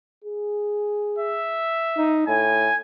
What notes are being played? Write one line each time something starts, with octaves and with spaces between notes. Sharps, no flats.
G#4
E5
D#4
A2 G#5